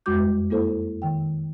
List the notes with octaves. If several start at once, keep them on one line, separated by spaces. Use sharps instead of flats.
F2 G3 G#3 F#4 D6 G6
F#2
A#3 E4 A4 C5
D#3 G5